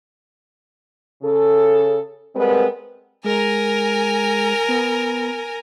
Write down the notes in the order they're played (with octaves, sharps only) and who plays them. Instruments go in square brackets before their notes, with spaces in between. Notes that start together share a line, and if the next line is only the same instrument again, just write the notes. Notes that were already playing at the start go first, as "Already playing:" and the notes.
[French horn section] C#3 A4
G3 G#3 B3 C4 A#4 B4
[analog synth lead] G#3 [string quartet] A#4 G#5 A#5
[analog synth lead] B3